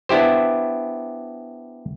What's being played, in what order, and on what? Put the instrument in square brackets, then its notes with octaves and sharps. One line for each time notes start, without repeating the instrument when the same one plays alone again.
[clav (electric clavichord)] B3 D4 E4 G4 C5